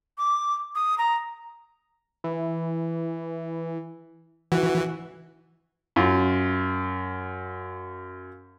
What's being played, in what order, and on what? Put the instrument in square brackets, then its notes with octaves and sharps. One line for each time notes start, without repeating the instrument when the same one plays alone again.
[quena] D6
D#6
A#5
[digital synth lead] E3
[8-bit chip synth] E3 [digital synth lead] F#4
[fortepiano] F#2 F4